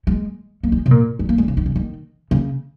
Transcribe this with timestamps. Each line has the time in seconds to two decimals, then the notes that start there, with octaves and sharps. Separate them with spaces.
0.07 G#3
0.63 A#3
0.72 G#3
0.86 C3
0.91 A#2
1.19 G#3
1.29 A#3
1.38 G#3
1.48 C#3
1.57 D#3
1.66 C#3
1.76 D#3
2.31 C#3